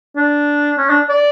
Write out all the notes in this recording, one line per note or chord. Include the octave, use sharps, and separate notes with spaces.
D4
C#4
D4
D5